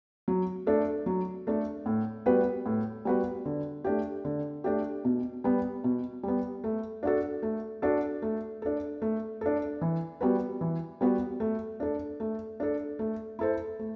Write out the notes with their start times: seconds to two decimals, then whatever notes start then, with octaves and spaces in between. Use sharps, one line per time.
0.28 F#3
0.67 A3 D4 A4
1.06 F#3
1.47 A3 D4 A4
1.86 A2
2.26 G3 B3 F#4 B4
2.66 A2
3.05 G3 B3 F#4 B4
3.45 D3
3.84 A3 D4 G4
4.25 D3
4.64 A3 D4 G4
5.05 B2
5.44 G3 B3
5.84 B2
6.23 G3 B3
6.64 A3
7.03 D4 F#4 A4
7.42 A3
7.82 D4 F#4 A4
8.22 A3
8.62 D4 A4
9.02 A3
9.41 D4 A4
9.81 E3
10.21 G3 B3 F#4 B4
10.61 E3
11.01 G3 B3 F#4 B4
11.40 A3
11.80 D4 A4
12.20 A3
12.60 D4 A4
12.99 A3
13.39 E4 A4 C5
13.79 A3